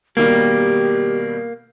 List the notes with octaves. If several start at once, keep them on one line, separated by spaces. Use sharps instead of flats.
B2 D#3 G3 A#3 G4